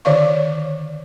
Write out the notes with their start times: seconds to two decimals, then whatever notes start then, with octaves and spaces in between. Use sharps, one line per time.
0.05 D3 D#3 C#5 D5 F5 C#6